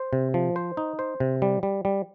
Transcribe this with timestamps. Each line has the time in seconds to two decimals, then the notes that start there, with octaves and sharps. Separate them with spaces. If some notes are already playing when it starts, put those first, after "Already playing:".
Already playing: C5
0.13 C3
0.34 F3
0.56 C5
0.77 D#4
0.99 C5
1.20 C3
1.42 G3
1.63 G3
1.85 G3